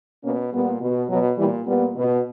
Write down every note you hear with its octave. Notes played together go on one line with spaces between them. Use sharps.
B2 A#3 C#4
A#2 G3 B3
B2
B2 F#3
A#2 E3 G3
A#2 G3 B3
B2